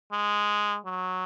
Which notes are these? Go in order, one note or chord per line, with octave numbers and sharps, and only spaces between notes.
G#3
F#3